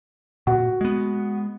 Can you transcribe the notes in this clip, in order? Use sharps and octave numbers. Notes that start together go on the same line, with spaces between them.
A#2 F#4
G#3 B3